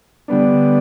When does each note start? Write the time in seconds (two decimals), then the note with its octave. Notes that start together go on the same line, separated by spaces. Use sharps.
0.28 D3 G3 B3 D4